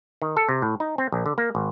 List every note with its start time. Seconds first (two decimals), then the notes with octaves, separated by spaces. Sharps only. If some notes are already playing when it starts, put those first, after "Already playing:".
0.22 D#3
0.37 A4
0.49 C3
0.62 A2
0.80 D#4
0.98 C4
1.12 A#1
1.26 D3
1.38 A#3
1.55 G#1